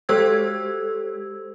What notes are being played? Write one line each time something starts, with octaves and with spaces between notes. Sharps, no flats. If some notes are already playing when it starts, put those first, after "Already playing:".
G#3 G4 A4 C5 E6 G#6